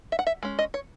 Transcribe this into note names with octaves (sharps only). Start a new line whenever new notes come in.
E5
F#5
E5
G#3 C#4
D#5
C#5